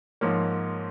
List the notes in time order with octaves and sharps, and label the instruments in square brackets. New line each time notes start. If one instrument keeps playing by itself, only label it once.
[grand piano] G#2 F3 A#3 C#5